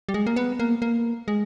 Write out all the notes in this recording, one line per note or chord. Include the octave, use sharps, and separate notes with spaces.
G3
G#3
A#3
B3
A#3
A#3
G#3